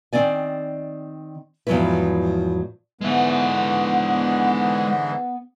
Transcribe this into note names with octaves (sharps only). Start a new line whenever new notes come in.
D#3 C4 D5 G#5
E2 G#2 F3 F#3 E4 B4
G#2 D3 E3 G#3 B3 E5